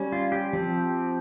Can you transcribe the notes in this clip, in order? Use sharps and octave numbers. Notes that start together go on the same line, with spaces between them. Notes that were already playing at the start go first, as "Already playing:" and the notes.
Already playing: G3 C#4
F4
G4
F3 C4